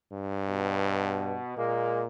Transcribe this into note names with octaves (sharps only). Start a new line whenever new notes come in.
G2
B2
A#2 G#3 A#3